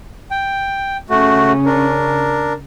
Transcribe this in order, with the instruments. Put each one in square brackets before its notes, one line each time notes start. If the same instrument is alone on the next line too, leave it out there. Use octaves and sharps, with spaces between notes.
[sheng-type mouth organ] G5
[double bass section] C#3 C#4 [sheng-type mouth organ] A3 F#4
[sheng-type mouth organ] D4 A#4